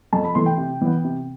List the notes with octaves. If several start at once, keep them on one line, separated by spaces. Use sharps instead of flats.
F2 A5
B5
E3 A3 C6
G5
C3
E3 B3
C3